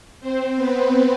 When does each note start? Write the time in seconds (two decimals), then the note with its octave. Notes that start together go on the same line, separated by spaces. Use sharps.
0.20 C4 C5
0.56 B3 B4